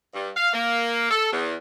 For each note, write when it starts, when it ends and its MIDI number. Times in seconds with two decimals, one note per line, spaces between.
0.14 0.30 43
0.35 0.50 77
0.53 1.06 58
1.10 1.31 69
1.32 1.54 40